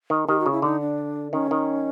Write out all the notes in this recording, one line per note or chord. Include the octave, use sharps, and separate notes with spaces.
D#3
D#3 G4
F#4
C#3
E4
D3 D#4
D4
D#3 C#4
D#3